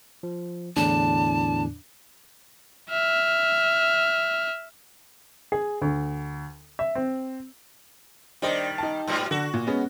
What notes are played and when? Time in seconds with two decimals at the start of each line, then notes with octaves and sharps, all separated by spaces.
0.23 F3
0.76 E2 A2 D3 D4 A5
2.90 E5 F6
5.52 G#4
5.82 D2
6.79 E5
6.95 C4
8.42 D#3 G3 D4 C5 D#5
8.78 D#4 A5
9.08 G#2 B2 G3
9.31 D3 F#4
9.54 A#2
9.67 G#3 B3 C#4